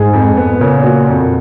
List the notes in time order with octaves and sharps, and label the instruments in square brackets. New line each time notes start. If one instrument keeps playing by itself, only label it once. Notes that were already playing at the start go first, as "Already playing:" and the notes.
Already playing: [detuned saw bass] G#2 [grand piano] G#4
[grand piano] F2
B3
[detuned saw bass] A#2 [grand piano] C#3
[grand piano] F#4
F2